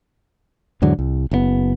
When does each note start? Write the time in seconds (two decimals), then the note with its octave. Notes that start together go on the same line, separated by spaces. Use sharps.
0.82 E2 G#2 D3 F#3
0.99 C2
1.31 F#1 B2 B3